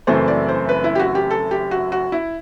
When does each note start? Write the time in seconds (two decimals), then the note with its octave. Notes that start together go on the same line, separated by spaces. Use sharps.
0.07 F#1 F#2 E3 A3 C4 C5
0.28 D5
0.49 C5
0.69 B4
0.84 E4
0.95 G4
0.99 F#4
1.15 G4
1.31 A4
1.51 G4
1.71 F#4
1.92 F#4
2.12 E4